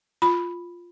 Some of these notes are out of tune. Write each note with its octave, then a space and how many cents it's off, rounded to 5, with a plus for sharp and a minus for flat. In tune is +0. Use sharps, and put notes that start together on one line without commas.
F4 +0 B5 +0